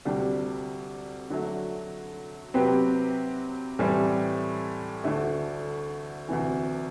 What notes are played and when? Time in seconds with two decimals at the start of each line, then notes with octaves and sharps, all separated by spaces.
0.05 D2 C3 G3 D4 G4
1.30 D3 F#3 A3
2.54 C3 F#3 C4 G4 B4
3.79 A2 E3 G3 C4
5.04 D2 D3 A3
6.29 D2 C3 E3